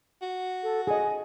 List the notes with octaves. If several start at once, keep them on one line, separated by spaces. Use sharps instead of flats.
F#4
A4
G#4 D#5 G#5